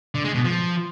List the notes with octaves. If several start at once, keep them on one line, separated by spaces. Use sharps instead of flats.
D3
G#3
B2
F3